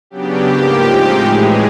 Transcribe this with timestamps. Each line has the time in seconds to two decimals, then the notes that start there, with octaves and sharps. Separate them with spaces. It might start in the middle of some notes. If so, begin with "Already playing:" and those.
0.10 C#3 F#3 B3 D4 G4
0.47 G#2 F3 A#3
0.84 A2 F3 G#3 C4 D#4
1.21 A2 E3 G#3 G#4